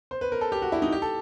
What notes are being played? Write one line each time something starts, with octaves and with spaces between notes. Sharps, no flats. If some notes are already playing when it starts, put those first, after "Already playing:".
C5
B4
A#4
A4
G4
F#4
E4
D#4
G4
A4